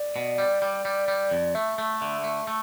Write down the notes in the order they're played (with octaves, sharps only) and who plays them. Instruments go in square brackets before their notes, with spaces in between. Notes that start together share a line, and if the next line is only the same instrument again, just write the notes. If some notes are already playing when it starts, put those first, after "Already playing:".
Already playing: [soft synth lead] D5
[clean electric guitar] B2
G3
G3
G3
G3
F2
[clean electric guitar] A3 [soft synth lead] E5
[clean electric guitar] A3
[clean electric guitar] D3 [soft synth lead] E5
[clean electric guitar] A3
A3